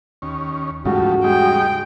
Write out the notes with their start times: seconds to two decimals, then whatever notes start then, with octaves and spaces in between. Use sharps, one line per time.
0.22 D#2 C#4
0.85 E2 G#2 C#3 F3 G3 A3 F#4
1.24 G3 G#3 D#4 G5